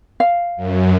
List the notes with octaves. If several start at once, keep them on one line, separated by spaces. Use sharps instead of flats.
F5
F#2